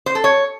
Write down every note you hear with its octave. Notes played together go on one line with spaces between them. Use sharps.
C5
A4
C#5